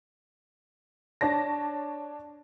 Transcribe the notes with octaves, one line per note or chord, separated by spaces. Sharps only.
D4 C#5 A5 A#6